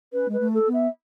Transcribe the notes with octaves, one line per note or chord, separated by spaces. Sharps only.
C#4 B4
G#3
B4
A3
A4
B3
E5